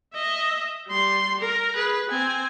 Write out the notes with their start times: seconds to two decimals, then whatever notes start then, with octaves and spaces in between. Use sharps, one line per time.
0.15 D#5 E5
0.88 G3 C6
1.40 A#4
1.75 G#4 B4
2.09 C4 G#5